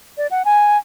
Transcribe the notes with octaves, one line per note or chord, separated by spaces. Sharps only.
D5
F#5
G#5